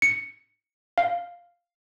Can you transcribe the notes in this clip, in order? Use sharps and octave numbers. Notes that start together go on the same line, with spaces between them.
C#7
F5